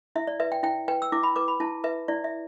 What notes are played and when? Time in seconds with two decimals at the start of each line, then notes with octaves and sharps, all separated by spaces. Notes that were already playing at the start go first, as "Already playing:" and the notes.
0.16 E4 E5
0.27 D5
0.40 B4 E5
0.52 G5
0.63 E4 G5
0.88 B4 G5
1.02 E6
1.12 E4 D6
1.23 B5
1.36 B4 D6
1.48 B5
1.60 E4 A5
1.84 B4 E5
2.08 E4 D5
2.24 E5